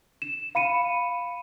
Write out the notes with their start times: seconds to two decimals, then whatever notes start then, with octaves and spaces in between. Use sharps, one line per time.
0.22 E7
0.55 F5 B5 C#7 D#7